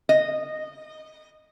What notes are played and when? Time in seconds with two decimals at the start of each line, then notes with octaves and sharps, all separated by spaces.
0.09 D#5